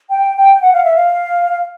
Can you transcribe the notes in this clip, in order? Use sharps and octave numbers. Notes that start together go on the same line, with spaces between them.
G5
G5
F#5
F5
E5
F5